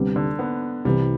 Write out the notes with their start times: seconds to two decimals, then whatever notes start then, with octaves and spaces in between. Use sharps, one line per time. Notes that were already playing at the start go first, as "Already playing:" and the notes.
Already playing: D2 C3 G3 B3
0.16 D3
0.39 B3
0.85 C2 C3 E3 G3